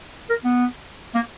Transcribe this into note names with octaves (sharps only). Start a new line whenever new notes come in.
A#4
B3
A#3